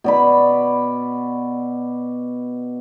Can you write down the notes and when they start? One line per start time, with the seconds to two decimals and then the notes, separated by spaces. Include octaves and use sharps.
0.04 B2 D5 B5